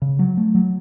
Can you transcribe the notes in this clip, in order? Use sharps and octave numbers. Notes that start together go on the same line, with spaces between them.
C#3
F#3
A3
F#3